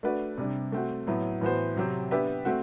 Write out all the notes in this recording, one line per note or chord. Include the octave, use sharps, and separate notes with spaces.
A3 D4 F#4 B4 D5
C3 G3 D4
A3 C4 F#4
A2 F#3 B3
A2 E3 B3 F#4 C5
C3 F#3 C4 G4
B3 D4 G4 B4 E5
A3 C4 F#4